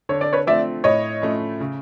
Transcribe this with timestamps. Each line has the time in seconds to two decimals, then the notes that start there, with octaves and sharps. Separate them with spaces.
0.09 D3 C#5
0.21 D5
0.33 B4 C#5
0.47 F3 A3 C4 D5 E5
0.84 A2 C#5 D#5
1.22 F3 A3 C#4
1.60 C#3